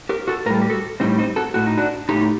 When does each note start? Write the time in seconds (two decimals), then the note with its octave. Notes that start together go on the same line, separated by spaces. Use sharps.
0.09 G4 A#4
0.28 F#4 A4
0.46 A2 A#4
0.50 G3 A4
0.62 G4
0.70 F#4 A4
1.00 A2 G3 C4 D#4
1.18 C4 D#4
1.36 F#4 A4
1.54 A2 A3 F#4
1.66 D#4
1.78 D4 F#4
2.09 A2 A3 D#4 G4